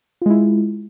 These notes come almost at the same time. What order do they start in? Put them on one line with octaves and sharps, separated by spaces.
F4 G#3 E4